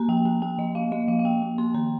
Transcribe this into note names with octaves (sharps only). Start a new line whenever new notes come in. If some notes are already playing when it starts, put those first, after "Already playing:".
Already playing: A#3 A#5
F3 G5
A#3
A#3 G5
F3 D#5
A#3 F5
A#3 D#5
F3 F5
F5
A#3 G5
A#3
A#3 C6
D#3 A#5